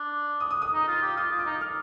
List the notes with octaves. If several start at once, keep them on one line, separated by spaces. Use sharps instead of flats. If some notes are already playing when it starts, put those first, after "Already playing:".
Already playing: D4
D#6
D#6
D#6
D#4
F4
G4
F4 D#6
F4
D6
D#4
F6